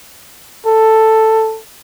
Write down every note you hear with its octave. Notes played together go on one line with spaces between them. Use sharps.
A4